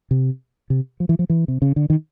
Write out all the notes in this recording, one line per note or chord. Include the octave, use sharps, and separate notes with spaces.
C3
C3
F3
E3
F3
E3
C3
C#3
D3
D#3